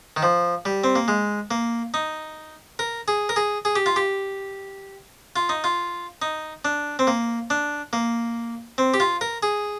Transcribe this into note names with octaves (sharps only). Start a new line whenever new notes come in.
D#3
F3
G3
C4
A#3
G#3
A#3
D#4
A#4
G#4
A#4
G#4
G#4
G4
F4
G4
F4
D#4
F4
D#4
D4
C4
A#3
D4
A#3
C4
G4
F4
A#4
G#4